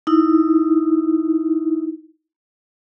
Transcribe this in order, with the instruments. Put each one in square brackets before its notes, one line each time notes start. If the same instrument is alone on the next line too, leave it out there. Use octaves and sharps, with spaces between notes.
[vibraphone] D#4 E4